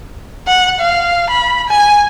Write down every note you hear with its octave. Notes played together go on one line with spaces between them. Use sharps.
F#5
F5
B5
G#5